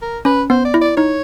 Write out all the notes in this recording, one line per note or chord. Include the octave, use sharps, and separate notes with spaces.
A#4
C#4 B4
B3 C5
D5
E4
D5
D#4 C#5